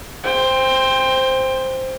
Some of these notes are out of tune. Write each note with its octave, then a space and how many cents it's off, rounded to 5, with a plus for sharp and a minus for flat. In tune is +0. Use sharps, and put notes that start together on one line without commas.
C5 +0 G5 +25